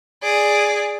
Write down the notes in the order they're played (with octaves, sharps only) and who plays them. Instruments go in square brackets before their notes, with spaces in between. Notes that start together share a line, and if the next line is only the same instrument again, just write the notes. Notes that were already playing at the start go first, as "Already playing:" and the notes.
[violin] G#4 D5